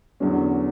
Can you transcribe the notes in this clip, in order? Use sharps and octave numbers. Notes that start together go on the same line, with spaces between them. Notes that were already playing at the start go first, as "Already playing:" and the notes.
E2 D3 F#3 C#4